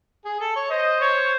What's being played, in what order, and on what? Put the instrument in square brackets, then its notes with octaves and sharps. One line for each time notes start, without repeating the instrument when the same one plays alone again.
[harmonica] G#4
A4
C#5
[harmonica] C5 [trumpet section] D#5
[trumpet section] C#5